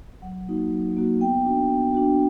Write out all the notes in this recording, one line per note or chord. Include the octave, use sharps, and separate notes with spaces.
F#3 F#5
A#3 D#4 F#4
F#3
A#3 D#4 F#4
B3 G5
D4 F#4
B3
D4 F#4